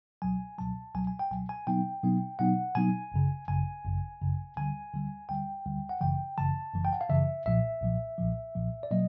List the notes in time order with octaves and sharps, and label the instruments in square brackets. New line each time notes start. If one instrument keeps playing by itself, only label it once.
[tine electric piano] C#2 B2 F#3 G#5
C#2 B2 F#3 A5
C#2 B2 F#3 G#5
G#5
G5
C#2 B2 F#3 G#5
G#5
B2 F#3 B3 D#4 G5
B2 F#3 B3 D#4
B2 F#3 B3 D#4 F#5
B2 F#3 B3 D#4 G#5
G#1 F#2 C#3
G#1 F#2 C#3 G#5
G#1 F#2 C#3
G#1 F#2 C#3
D2 D3 G3 G#5
D2 D3 G3
D2 D3 G3 G5
D2 D3 G3
F#5
G1 F#2 C#3 E3 G5
G1 F#2 C#3 E3 A5
G1 F#2 C#3 E3
G5
F#5
F5
G1 F#2 C#3 E3 E5
B1 A#2 F3 E5
B1 A#2 F3
B1 A#2 F3
B1 A#2 F3
D5
B2 F#3 A#3 D#5